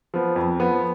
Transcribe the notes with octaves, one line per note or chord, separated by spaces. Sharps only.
F3 B3
F2
F3 B3